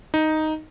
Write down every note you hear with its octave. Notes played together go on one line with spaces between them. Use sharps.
D#4